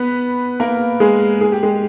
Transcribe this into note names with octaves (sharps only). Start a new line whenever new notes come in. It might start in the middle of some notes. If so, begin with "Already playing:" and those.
Already playing: B3 B4
A#3 A#4
G#3 G#4
G#4
G4
G#3 G#4